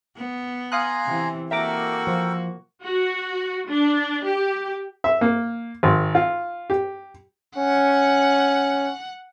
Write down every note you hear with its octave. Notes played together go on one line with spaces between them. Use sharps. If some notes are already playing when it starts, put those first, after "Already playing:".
B3
F5 G#5 A#5 C6 D#6 F#6
C3 E3
A#3 F#4 A4 A#4 E5 G5 A#5 D6
F3
F#4
D4
G4
E5
A#3
G#1
F4
G4
C#4 F#5